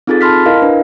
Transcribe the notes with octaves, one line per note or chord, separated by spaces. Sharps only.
C4 D#4 F4 G#4 A4 A6
A5 B5 C6 F6 B6
E4 A#4 D#5 F5
D4 B4